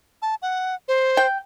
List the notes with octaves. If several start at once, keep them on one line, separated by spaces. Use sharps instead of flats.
A5
F#5
C5
G5